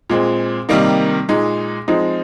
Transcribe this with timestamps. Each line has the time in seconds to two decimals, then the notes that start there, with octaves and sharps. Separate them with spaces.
0.10 A#2 G#3 C4
0.69 C3 D#3 G3 A#3 D#4
1.29 A#2 G#3 D#4
1.88 F3 G#3 C4 D#4